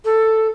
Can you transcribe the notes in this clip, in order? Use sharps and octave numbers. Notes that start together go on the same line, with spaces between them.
A4